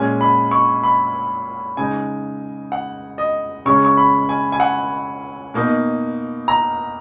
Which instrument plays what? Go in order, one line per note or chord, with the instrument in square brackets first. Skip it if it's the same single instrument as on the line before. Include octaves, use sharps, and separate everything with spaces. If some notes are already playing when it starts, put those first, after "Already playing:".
Already playing: [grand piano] A#2 G#3 C#4 G#5
B5
C#6
B5
C#3 G#3 D#4 G#5
F#5
D#5
C#3 G#3 C#4 C#6
C#6
B5
G#5
G#5
F#5
B2 A#3 D#4
A#5